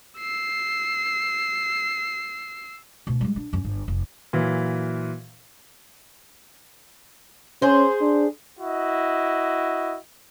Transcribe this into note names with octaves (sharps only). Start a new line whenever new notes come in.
E6 C7
D2 B2
G3 G#3
D4
F#2 C#4
G1
F1
A#2 E3 F#3
C#4 G#4 C5
D4
E4 F#4 D#5